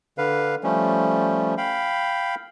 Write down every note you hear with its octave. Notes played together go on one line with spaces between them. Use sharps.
D3 B4 F5
F3 G3 A3 C#4
F5 G5 B5